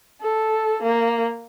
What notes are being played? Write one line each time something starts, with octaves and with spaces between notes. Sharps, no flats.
A4
A#3